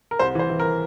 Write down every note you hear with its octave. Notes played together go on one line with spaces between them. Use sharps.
A#4
C2 C5
E3 C5
E3
A#4